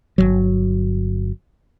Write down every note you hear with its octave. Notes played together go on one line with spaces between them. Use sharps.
G1 C2 F#3